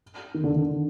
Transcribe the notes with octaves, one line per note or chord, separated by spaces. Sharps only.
D#3
D3
D3